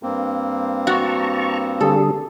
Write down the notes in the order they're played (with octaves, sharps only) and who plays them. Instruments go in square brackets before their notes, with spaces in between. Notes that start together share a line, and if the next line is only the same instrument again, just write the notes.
[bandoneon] G2 A#3 C4
[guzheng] F#4 [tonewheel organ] A5 A#5 C#6
[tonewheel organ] D3 G3 G#4 [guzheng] A4